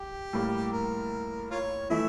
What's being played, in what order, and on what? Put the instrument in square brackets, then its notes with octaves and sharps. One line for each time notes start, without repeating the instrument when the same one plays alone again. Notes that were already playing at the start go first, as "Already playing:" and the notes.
Already playing: [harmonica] G4
[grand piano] A2 G3 A#3
[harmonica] A#4
F4 A#4 C#5
[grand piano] E3 A3 E4 [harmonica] E5